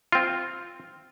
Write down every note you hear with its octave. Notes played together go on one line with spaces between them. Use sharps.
C4 F4